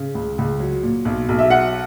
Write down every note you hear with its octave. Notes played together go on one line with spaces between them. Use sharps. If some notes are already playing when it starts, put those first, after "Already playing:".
Already playing: C#3
C#2
C#2
F#3
A#2
B1
B1
E5
F#3 F#5